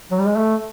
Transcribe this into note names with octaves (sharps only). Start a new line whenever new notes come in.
F#3
G3
G#3
A3